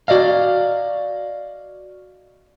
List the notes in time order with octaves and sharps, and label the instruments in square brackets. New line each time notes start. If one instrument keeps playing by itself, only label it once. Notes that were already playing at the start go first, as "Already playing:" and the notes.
[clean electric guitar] F#4 D5 D#5 F5